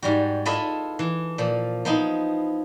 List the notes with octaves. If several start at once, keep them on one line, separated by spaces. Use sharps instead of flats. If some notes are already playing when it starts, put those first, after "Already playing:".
G#2 G3 F#4
E4 F4 A4 B4 D#5 E5
E3
A#2 F3
F3 B3 D#4 E4